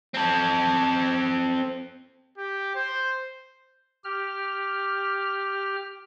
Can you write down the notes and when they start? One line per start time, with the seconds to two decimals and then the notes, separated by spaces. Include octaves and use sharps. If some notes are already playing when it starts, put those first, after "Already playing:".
0.14 C4 A4
2.38 G4
2.75 C5
4.04 G4 F6